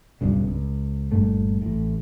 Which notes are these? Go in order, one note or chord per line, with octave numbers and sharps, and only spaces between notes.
D1 B1 G2 C#3
C#2
G1 G2 A#2 A3
A1 A2